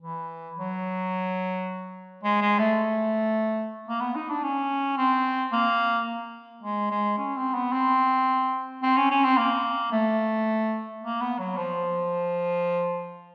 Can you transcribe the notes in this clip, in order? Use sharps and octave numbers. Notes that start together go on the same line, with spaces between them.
E3
F#3
G#3
G#3
A3
A#3
B3
D#4
D4
C#4
C4
A#3
G#3
G#3
C#4
C4
B3
C4
C4
C#4
C#4
C4
A#3
A3
A#3
B3
F#3
F3